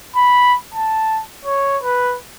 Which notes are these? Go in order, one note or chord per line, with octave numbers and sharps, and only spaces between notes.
B5
A5
C#5
B4